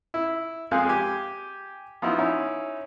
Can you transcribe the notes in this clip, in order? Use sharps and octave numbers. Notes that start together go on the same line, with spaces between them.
E4
F2 F3 G#3 G#4 F5 F#6
G4 G#5 D6
F3 B3 D#4 E4 F#4
C#4 D#4 E4